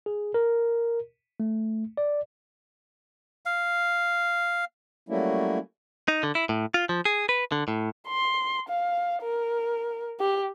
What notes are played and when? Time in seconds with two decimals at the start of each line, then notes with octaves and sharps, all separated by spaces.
0.06 G#4
0.34 A#4
1.40 A3
1.97 D5
3.46 F5
5.09 F#3 G3 A3 A#3 C#4 E4
6.08 D#4
6.23 D3
6.35 E4
6.49 A2
6.74 F4
6.89 F3
7.05 G#4
7.29 B4
7.52 D3
7.68 A2
8.08 C6
8.69 F5
9.22 A#4
10.20 G4